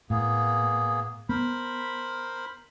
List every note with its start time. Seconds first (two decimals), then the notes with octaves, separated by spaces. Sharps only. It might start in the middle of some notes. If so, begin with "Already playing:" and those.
0.10 A2 A#3 B3 G#4
1.29 B3 A#4 C5 B5